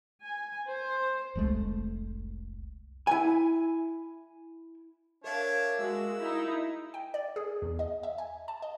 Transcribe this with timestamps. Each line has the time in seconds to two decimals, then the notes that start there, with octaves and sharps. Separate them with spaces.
0.21 G#5
0.67 C5
1.35 F1 C2 D3 G#3 A3
3.07 E4 G#5
5.24 D4 A#4 C#5 E5 F5
5.78 G#3 F#4 E6
6.19 D#4 E4
6.94 G5
7.14 D5
7.36 G#4
7.62 E2
7.79 D#5
8.03 E5
8.18 G#5
8.48 A5
8.62 D#5